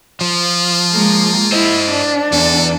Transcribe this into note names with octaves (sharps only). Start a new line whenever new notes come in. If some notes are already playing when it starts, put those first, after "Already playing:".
F3 F4
G#3 A#3
E4 C5 D#5
D4
E2 A4